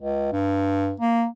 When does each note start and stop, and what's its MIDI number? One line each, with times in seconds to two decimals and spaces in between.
0.01 0.31 37
0.32 0.93 43
1.00 1.25 58